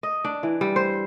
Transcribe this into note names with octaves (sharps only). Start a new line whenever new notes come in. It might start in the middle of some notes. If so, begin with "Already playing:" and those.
D#5
D4
E3
G3
C5